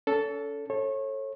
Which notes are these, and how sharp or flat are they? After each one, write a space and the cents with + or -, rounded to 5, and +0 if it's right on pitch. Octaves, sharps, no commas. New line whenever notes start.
C#4 +40 A4 +0
A4 +0 C#5 -30